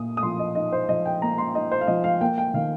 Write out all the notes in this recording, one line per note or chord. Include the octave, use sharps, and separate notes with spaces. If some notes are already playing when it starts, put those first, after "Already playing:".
Already playing: A#2 A#3 D#6
D#6
F3 C6
D#5
D#4 D#5
C5
F3 D#5
G5
A#3 A#5
C6
D#4 D#5
C5
F5
F3 D#5
F5
A#3 G5
G5
D#3 F5